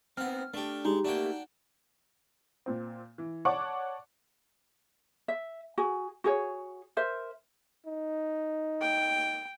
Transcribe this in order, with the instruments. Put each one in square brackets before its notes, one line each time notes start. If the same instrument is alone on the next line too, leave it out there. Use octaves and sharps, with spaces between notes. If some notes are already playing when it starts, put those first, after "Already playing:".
[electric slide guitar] B3 C4 [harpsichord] D#4 F#5 [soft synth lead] F6
[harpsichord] A3 G4 [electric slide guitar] D4
[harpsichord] G#3 [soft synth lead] D#4 [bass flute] G4
[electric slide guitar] A3 A#3 [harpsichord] D4 F#4 G5
[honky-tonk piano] A#2 C4
E3
C#5 D5 F#5 A5 C#6 D6
[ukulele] E5
F#4 G#4
F#4 G#4 C#5
A#4 C5 E5
[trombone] D#4
[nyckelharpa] G5